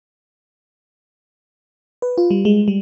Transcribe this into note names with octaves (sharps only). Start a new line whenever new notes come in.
B4
F4
G3
G#3
G3